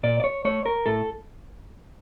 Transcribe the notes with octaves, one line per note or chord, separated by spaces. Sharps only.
A#2 D5
D5
C#5
A3 C#5
A#4
A2 A4